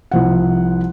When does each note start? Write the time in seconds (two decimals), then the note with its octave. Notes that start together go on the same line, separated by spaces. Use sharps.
0.11 C2 F3 F#5